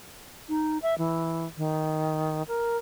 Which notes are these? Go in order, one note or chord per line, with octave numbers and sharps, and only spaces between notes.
D#4
E5
E3
D#3
A#4